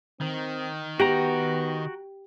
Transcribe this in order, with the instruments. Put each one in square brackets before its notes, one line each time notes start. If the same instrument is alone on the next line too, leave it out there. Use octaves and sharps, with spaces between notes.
[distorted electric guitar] D#3 [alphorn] C4
[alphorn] B3 [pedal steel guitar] F#4 G5 A#5 [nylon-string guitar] G4